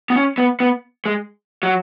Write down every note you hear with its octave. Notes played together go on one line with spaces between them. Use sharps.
B3
C#4
B3
B3
G#3
F#3